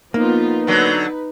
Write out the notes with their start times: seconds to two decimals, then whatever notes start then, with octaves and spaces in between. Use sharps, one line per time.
0.14 F3 A#3 B3 D#4 F4
0.67 D3 F#3 B4